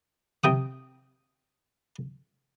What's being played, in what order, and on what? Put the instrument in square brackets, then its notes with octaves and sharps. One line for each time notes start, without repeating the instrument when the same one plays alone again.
[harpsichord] C3 G5 D#6